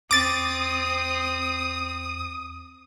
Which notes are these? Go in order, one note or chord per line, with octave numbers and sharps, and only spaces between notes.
E2 C4 D6 D#6 A6